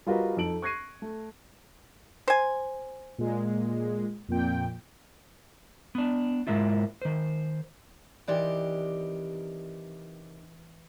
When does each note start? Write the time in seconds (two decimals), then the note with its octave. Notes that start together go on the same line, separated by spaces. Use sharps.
0.06 G3 F4 F#4 A#4 B4 D#5
0.37 F2 D#4 A4 D7 F#7
0.62 C#6 F#6 G#6 A#6 C7 D#7
1.02 A3
2.28 C5 G#5
3.18 A#2 G#3
4.29 F2 A#2 G5
5.95 B3 D4
6.47 G#2 C#3 G#3 A#3 E4 F4
7.02 D#3 C5
8.28 C3 D#3 E3 G4 D5 C6